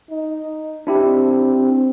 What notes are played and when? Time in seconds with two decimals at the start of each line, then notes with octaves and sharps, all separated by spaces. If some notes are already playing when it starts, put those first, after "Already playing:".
0.11 D#4
0.87 C4 D4 E4 G4